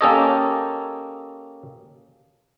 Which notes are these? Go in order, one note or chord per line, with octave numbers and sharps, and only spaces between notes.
A#3 C#4 G4 A4 C#5 D#5